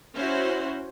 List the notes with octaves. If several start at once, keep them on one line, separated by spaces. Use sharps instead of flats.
C#4 E4 F#4 C5